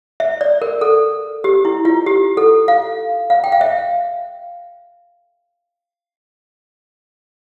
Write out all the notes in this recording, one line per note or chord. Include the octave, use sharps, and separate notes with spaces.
E5
D5
A#4
A4
G4
E4
F4
G4
A4
F5
F5
G5
F5
E5